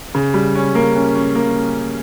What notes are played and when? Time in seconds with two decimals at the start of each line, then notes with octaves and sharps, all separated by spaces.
0.15 C#3
0.34 G3
0.55 C#4
0.75 A#3
0.95 C#4
1.15 C#4
1.35 A#3